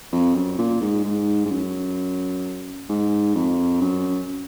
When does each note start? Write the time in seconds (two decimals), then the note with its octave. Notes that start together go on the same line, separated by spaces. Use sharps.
0.13 F2
0.35 F#2
0.58 A#2
0.82 G#2
1.04 G#2
1.45 G#2
1.51 F#2
2.89 G#2
3.35 F2
3.81 F#2